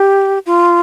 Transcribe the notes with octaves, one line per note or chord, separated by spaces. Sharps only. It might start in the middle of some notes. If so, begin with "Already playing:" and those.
Already playing: G4
F4